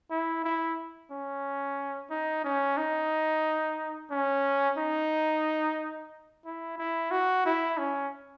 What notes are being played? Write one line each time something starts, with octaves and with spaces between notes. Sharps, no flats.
E4
E4
C#4
D#4
C#4
D#4
C#4
D#4
E4
E4
F#4
E4
C#4